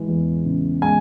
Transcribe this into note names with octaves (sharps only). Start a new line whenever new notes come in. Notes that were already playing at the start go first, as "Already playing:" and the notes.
Already playing: E3 G#3
E2
C#3
G#3 G#5